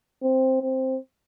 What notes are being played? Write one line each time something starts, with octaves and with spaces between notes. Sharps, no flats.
C4
C4